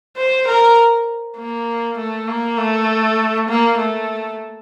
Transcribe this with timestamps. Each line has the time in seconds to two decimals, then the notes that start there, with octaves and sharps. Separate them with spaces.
0.17 C5
0.48 A#4
1.38 A#3
1.98 A3
2.28 A#3
2.58 A3
3.49 A#3
3.78 A3